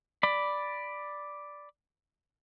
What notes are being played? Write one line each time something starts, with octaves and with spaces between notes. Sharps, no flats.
D5 B5